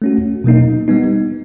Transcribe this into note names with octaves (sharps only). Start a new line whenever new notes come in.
A3 C#4 F#4
B2 F#3 A#3 D#4
G3 B3 D#4